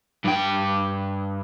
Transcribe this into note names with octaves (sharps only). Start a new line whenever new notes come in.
G2 G5